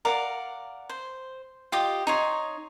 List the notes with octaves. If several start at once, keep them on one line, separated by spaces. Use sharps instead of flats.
A#4 D5 F5 F#5
C5
F4 G4 D#5
D#4 C#5 C6